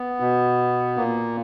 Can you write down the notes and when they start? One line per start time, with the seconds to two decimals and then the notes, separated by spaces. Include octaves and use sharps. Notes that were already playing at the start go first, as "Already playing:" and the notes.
Already playing: B3
0.20 B2
0.97 A#2 A#3